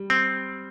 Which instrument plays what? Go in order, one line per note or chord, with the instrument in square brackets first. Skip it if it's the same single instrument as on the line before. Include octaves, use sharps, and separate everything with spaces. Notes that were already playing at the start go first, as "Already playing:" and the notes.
Already playing: [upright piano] G3
[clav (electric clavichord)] C4